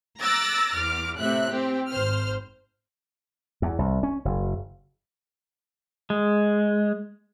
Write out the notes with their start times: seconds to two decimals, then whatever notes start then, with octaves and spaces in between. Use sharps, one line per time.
0.21 A#5 D6 E6 F#6 A6 A#6
0.75 E2 D6 F6
1.19 A2 C3 E5 F#6
1.50 C4 G4
1.90 G#1 C5 F6
3.62 E2
3.79 C2
4.03 C#4
4.25 F#1
6.10 G#3